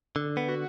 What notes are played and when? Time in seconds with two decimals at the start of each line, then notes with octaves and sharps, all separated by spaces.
0.16 D3
0.37 B3
0.48 F#4